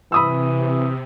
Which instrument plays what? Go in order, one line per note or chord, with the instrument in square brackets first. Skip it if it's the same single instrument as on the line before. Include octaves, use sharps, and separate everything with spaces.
[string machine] C3 [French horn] E3 [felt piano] B5 D#6 E6